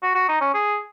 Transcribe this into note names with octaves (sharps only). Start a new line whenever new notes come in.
F#4
F#4
D#4
C#4
G#4